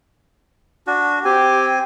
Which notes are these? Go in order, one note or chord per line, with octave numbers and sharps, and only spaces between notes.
D4 F#4
C4 G4 G#5